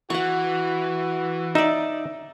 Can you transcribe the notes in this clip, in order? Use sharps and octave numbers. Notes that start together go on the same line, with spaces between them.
E3 F#4 F#5 C#6
D#4 D5 E5